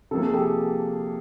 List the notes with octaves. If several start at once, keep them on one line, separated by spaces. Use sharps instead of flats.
C3 F3 A#3 A4
G#4
G4 A4